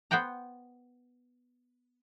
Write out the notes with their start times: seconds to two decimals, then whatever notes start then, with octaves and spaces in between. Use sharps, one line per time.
0.11 B3 C5 F#5 G5 A#5